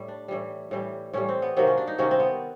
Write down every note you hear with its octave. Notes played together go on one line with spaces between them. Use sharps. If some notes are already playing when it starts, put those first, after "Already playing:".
Already playing: A2 G3 E4
D4
A2 E3 G3
A2 E3 G3
A2 E3 G3 C#4
C4
B3
C3 D#3 F#3 A#3 C4
C#4
D4
D#4
C3 D#3 F#3 A#3 C#4
C4
B3